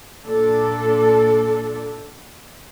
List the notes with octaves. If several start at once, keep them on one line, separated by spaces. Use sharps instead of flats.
A#2 D4 A4 D5